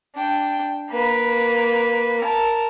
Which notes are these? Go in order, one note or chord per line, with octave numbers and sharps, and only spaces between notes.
D4 G5
A#3 B4
A#4 A5